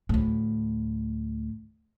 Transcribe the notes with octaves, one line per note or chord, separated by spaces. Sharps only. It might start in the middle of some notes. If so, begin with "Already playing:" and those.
D2 A2